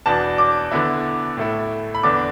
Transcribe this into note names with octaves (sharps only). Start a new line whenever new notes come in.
E2 B2 B3 D4 A5
D6
D3 B3 E4
A2 A3 E4
B5
E2 D3 B3 D4 D6